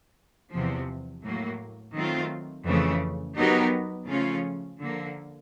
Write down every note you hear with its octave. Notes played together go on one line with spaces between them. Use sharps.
E2 C3 F3
A2 F#3 A#3
D#3 F#3 A3 C4 F4
F2 C#3 E3 A3
F#3 B3 D#4 G4 A#4
C#3 F3 A3 C#4 F4
D3 F3 A#3